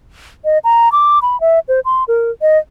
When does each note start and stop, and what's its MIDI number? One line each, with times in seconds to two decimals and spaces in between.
0.45 0.58 75
0.64 0.91 82
0.92 1.19 86
1.22 1.39 83
1.41 1.59 76
1.68 1.80 72
1.85 2.04 84
2.08 2.31 70
2.42 2.58 75